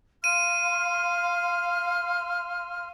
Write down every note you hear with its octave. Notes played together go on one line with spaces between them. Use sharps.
F5 C6 F6 D#7